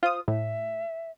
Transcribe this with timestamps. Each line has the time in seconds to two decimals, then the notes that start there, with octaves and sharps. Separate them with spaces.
0.03 F4 C5 D#6
0.28 A2 E5